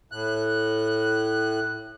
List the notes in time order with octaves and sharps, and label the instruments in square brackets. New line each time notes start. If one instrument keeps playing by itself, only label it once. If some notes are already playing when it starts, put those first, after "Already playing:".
[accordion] A2 F#6